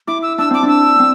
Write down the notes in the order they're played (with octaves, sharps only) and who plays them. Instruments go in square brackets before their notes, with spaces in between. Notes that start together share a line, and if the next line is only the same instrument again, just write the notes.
[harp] E4 [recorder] D6
[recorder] E6
[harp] D4 [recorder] E6
[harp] C4 [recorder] D6
[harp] D4
[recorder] E6
[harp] C4